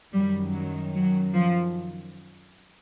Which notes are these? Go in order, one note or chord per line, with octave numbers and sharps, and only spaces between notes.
F#2 D#3 G3
F#3
F#3
F3